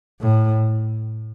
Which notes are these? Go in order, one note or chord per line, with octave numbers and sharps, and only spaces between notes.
A2